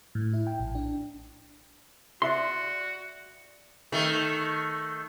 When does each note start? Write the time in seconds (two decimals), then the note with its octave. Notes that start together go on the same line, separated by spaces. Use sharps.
0.15 A2
0.33 E4
0.47 G5
0.60 A#1
0.75 D4
2.22 F#4 D5 E5 C6
3.92 D#3 A3